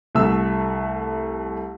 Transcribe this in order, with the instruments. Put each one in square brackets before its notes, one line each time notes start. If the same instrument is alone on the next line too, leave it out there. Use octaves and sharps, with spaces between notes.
[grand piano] C2 A3 E6